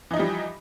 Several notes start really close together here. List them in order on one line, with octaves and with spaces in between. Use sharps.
E3 D#4 F3 G3